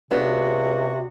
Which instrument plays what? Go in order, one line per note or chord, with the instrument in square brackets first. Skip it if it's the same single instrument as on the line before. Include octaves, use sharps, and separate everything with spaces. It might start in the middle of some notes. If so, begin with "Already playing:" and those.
[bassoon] C#2 [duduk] C3 [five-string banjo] B3 D4 [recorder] F#4